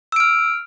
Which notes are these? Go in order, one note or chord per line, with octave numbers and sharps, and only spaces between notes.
E6 F6 D7